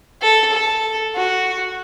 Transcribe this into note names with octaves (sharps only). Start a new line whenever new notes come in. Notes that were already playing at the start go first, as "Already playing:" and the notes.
A4
A4
F#4